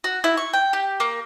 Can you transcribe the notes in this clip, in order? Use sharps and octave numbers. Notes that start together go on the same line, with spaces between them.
F#4
E4
C#6
G5
G4
A#3